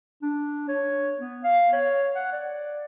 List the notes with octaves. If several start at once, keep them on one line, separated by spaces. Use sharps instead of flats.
D4
C#5
B3
F5
C#5
F#5
D5